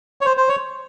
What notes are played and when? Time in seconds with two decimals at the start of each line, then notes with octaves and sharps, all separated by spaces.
0.21 C#5
0.26 C5
0.37 C5
0.49 C#5